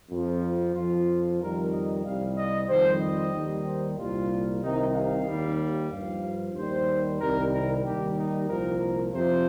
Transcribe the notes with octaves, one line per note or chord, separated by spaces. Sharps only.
F2 F3
F2 F3 F4
F2 D#3 G3 A#4
D#5
C2 C3 G3 F5
D#5
F2 D#3 G3 C5
D#5
D#2 D#3 G3
C5
C2 A#2 G3 F4
C2 C3 D#3 D#4
F5
D#2 D#3 G3
G2 F3 F5
D#2 D#3 G3 C5
C2 C3 D#3 G3 A#4
A#4
D#2 D#3 G3 G4
D#4
C2 A#2 F3 A#4
A#4
F2 C3 F3 C5